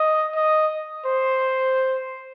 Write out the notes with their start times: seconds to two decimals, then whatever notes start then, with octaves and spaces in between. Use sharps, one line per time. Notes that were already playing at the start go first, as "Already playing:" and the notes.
Already playing: D#5
0.35 D#5
1.05 C5